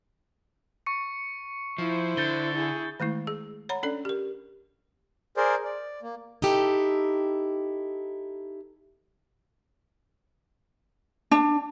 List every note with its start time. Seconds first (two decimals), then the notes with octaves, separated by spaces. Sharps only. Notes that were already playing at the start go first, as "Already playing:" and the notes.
0.86 C#6 C#7
1.78 F3 E4 C5
2.17 D3 G6 A6 G7
2.55 E4 G#4
3.00 D#3 G#3 A3 E4
3.27 G#4
3.69 C#5 F#5 A#5 B5
3.83 C#4 D4 A4 D5
4.05 G4 A#4
5.37 G#4 A#4 C5 D5
5.65 D5
6.02 A#3
6.42 D#4 E4 G4 A4
11.31 D4